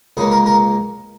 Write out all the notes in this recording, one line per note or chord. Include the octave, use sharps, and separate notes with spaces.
C#2 C#3 A#3 G#4
A#4
A#4